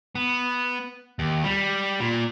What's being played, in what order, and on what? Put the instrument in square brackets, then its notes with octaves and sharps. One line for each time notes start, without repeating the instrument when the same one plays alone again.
[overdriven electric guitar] B3
D#2
G3
A#2